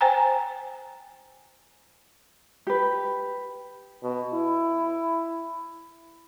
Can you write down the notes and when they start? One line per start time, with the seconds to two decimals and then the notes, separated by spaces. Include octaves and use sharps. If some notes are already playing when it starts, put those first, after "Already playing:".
0.01 C5 G5 G#5 A#5
2.67 G4 B4
4.03 B2
4.34 E4